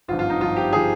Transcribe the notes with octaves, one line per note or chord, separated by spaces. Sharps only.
G#1 G2 F3 F4
F4
D#4
G#1 G2 F3 F4
G4
F3 G#4